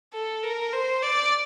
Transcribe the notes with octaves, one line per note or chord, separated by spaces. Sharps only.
A4
A#4
C5
D5